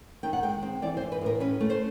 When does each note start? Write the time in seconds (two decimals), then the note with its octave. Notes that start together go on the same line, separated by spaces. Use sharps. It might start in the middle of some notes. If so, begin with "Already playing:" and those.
0.23 D#3 G5
0.33 F#5
0.43 G#3 G5
0.63 C4
0.82 E3 D5
0.97 C5
1.01 E3
1.12 B4
1.21 A2 A#4
1.40 C#4 B4
1.61 A3
1.70 C5